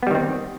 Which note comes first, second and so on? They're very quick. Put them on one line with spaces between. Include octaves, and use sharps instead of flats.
B3 G3 D#3 C4